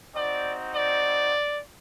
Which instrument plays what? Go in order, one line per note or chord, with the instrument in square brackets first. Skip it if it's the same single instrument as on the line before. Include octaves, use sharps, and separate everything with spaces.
[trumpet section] C4 D#4 F#4 D5
D5